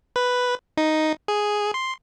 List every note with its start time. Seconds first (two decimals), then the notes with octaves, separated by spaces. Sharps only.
0.16 B4
0.77 D#4
1.28 G#4
1.74 C6